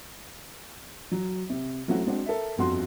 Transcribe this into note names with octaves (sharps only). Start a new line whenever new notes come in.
F#3
C3
F#3 A3 C4 C#4 E4 F#4
G#3 C4 D4 F#4
A4 A#4 E5
G1 F2 F#4 C6